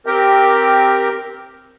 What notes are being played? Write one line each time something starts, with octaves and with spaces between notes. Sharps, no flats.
C4 G4 A#4 G5